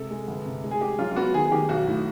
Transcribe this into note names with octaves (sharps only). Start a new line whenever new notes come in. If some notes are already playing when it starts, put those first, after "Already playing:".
Already playing: C3 G#3 A4
G#3
G1
C3
G#3
G#4
G#3 G4
F#3 F4
F4
B3 F#4
D#3 G#4
G#4
D#3 G4
B1 F#4
A2